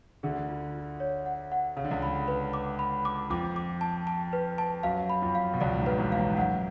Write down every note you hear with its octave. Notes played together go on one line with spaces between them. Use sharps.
D2 D3 G#4
F4
F4
C#5
F#5
F#5
C#3 F5
D3
C#2 C#3
B5
B4
D6
B5
D6
F2 F3 D6
D6
A5
A5
B4
A5
F#2 F#3 F5
B5
F2 F3
F5
B2
C#2 C#3 D5
G#2
B4
A1 A2
F5
G#2
F#2 F#5